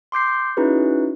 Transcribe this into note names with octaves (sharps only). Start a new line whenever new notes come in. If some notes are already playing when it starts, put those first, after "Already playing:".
C6 D6 G6 C7
C#4 D#4 E4 F#4 G#4 B4